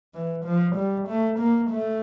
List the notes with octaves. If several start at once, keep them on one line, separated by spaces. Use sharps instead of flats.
E3
F3
G3
A3
A#3
A3